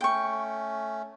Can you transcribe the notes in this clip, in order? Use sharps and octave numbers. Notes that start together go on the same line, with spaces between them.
A3 C#4 G5 C#6